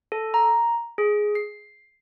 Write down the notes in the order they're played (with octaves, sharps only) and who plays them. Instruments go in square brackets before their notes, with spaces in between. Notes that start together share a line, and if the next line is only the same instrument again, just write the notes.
[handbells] A4
A#5
G#4
C7